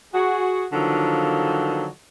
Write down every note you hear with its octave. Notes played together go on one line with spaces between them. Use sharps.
F#4 G#4
D3 D#3 F3 F#3 A#3 B3